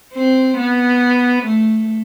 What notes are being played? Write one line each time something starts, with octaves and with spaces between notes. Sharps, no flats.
C4
B3
A3